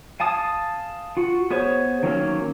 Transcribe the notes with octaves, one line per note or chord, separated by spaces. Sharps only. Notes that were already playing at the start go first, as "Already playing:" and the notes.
F5 G#5 A5 D#6
F4 F#4
B3 G#4 C5 C#5
D#3 F#3 A#3 C#4